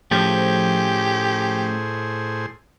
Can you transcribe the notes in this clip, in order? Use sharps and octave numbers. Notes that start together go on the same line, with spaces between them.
A2 F3 A3 C#4 G4 G#4 C5